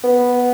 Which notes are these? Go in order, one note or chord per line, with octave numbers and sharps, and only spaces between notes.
B3